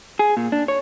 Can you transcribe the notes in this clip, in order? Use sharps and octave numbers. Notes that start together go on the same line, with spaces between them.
G#4
A#2
D4
C#5